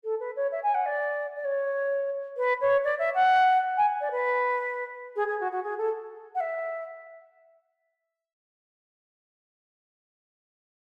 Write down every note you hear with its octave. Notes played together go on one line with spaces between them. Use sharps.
A4
B4
C#5
E5
G#5
F#5
D5
D5
C#5
B4
C#5
D5
E5
F#5
G#5
D5
B4
G#4
G#4
F#4
F#4
G#4
A4
F#5
E5